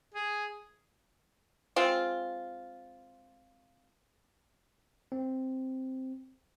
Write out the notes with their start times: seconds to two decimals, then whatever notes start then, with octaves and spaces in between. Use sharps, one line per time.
0.14 G#4
1.76 G#3 C4 F4
5.12 C4